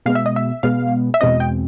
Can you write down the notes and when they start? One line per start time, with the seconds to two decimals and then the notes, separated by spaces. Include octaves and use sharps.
0.06 B2 G#3 B3 F5
0.15 E5
0.26 D#5
0.36 E5
0.63 B2 G#3 B3 F5
1.14 E5
1.21 E2 B2 G#3 C4 D#5
1.40 G5